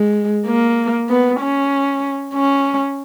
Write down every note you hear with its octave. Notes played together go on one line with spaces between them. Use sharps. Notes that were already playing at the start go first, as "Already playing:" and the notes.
Already playing: G#3
A#3
B3
C#4
C#4